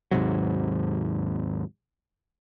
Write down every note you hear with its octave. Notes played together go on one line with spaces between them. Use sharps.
D#2 G#2 C3 F#3